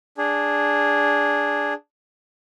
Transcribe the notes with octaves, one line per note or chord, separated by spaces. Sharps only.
D4 G#4